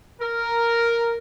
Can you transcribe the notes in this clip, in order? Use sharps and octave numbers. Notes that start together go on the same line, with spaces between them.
A#4